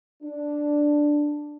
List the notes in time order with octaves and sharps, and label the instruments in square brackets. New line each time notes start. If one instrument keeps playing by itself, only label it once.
[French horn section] D4